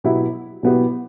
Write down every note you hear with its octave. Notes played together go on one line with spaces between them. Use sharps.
B2 F#3 B3 E4 G4
B2 F#3 B3 E4 G4